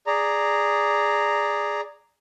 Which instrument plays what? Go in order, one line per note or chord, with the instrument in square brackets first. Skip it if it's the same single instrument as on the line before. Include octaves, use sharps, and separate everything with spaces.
[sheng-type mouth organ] G#4 D5 A#5